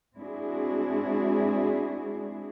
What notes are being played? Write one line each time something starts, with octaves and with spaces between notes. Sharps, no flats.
G#3 C4 D4 E4 F#4 G#4